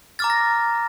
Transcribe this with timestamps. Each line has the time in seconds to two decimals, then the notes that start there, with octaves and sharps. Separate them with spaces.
0.19 A#5 D6 F6 A6
0.30 A#6